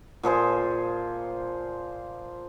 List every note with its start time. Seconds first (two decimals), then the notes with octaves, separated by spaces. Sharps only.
0.23 A#2 F3 G#4 C5